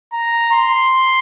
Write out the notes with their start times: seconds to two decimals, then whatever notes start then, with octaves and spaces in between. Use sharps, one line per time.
0.12 A#5
0.51 C6